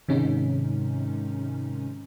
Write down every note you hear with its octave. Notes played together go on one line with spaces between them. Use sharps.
G#2 C3 D#3 G#3 C#4 D#4